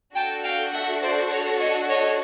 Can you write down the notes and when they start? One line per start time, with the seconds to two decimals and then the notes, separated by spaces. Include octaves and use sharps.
0.15 D4 F#4 A4 G5 A5
0.44 F5 G5
0.73 E5 F#5
1.02 C5 D5
1.32 C#5
1.60 C#5 D#5
1.89 C#5 D#5